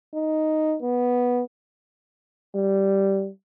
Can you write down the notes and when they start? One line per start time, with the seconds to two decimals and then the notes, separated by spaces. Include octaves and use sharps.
0.15 D#4
0.82 B3
2.55 G3